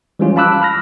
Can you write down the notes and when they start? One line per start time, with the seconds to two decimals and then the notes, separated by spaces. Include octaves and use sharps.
0.19 E3 F3 G3 G#3 C#4 F4
0.36 F5 A5 B5 D6 E6 F#6
0.62 B5 F6 A#6